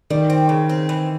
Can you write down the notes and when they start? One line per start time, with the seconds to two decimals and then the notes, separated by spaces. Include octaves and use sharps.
0.10 D#3 G3
0.30 C4
0.49 C#3
0.69 C4
0.89 E3